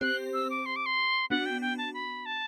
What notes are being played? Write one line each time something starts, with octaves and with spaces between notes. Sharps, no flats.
C4 G4 C5 F#6
E6
D6
C6
D6
C6
B3 D4 F#4 F#5
G5
G5
A5
B5
A5